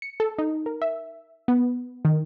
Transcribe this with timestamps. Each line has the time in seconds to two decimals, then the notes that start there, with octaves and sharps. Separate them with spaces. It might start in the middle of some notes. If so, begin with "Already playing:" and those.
0.02 C#7
0.20 A4
0.38 D#4
0.66 A#4
0.82 E5
1.48 B3
2.05 D#3